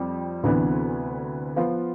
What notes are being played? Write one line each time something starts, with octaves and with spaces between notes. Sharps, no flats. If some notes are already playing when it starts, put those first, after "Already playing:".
Already playing: F2 G3
D2 C3 E3 B3 D4
F3 B3 F4